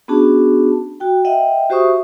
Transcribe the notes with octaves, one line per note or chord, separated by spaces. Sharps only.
B3 C#4 D4 F#4 G#4 A5
F#4 G5
D#5 E5 F#5 G5
F#4 G4 C5 E5 C#6 D#6